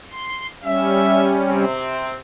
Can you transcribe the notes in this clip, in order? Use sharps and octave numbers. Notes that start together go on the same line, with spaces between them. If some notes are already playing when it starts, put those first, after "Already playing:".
C6
G3 C#4 E5
C3 C4